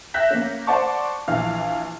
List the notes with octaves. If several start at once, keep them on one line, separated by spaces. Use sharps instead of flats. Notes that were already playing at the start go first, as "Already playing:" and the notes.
E5 F#6 G6 A#6 B6
A#3 C#4
C5 D5 F#5 A5 C#6 D6
A#1 E3 F5 F6